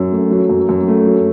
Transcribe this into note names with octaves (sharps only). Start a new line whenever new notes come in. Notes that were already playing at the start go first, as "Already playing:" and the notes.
Already playing: F#2
A3
F#3
F#2
F#2
A3
F#3